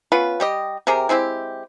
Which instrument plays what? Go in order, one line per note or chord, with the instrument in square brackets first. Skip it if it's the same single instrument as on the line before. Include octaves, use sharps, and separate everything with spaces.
[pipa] B3 C#4 F4 B4
G3 G4 D#5
C3 G4 G#4 A#4
G#3 C4 E4 G4